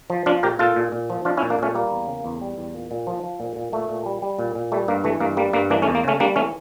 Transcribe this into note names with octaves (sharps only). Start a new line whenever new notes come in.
F3
F3 D4 F4
A#2 G4 A#4
A#2 F4 A4
A#2
A#2
F3
F3 D4 F4
C#4 E4
A#2
A#3 D4
A#2 A3 C#4
G3 A#3
E2
C#3
E2
G3
E2
A#2
A#2
F3
F3
A#2
A#2
A#2 A3
A#2
G3
G3
A#2
A#2
G3 A3
G2 A#3
E3 A3
G2 A#3
G3 A#3
G2 A#3
E3 A#3 D4
A3 C#4
E2
A#3
C#3 A3 C#4
G3 A#3 D4
E3 A3 C#4